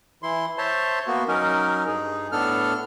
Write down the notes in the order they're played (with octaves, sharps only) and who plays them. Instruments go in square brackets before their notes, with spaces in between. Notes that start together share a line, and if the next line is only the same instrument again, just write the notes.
[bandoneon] E3 E4 C6
C5 C#5 E5 A5 C6
A#3 B3 F#4
F#3 C#4 D#4 A#4
G2 D#4 G#4
A2 B3 D4 A4 F6